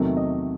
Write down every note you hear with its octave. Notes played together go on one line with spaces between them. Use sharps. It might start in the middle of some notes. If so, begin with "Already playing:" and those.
Already playing: E2 C3 D#3 F#3 A3
D#5